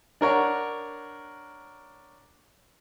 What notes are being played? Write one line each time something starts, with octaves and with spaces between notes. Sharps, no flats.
D4 A#4 C#5 F#5